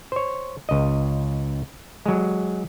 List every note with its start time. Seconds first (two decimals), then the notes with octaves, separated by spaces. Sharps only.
0.12 C5 C#5
0.69 C#2 D#5
2.06 F#3 G#3